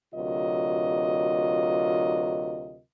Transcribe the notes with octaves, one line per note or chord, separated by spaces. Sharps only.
D2 C3 F#3 F4 A#4 D#5